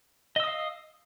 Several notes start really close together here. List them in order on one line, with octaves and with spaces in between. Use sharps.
D#5 E6 D#6 F5